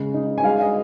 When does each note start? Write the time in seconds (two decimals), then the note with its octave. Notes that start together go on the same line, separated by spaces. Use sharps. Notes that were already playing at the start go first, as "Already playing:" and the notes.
Already playing: C#3 G#3
0.14 D#4
0.38 G#5
0.44 G#3 F5
0.61 D#5